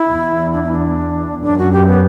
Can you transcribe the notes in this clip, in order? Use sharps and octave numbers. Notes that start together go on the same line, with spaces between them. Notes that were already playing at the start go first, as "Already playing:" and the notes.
Already playing: E4
E2
D4
E4
D4
F#2 D4
F#4
G4
B3